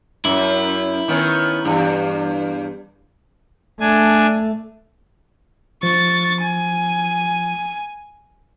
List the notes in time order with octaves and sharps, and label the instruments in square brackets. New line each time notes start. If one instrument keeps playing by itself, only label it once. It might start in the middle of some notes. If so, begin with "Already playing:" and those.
[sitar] F#2 [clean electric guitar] E4
[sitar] D#3 B3 C#4
E2 G2
[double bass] A3 [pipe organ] D4 G#5
[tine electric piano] F3 [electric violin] C#6 A6
[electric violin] G#5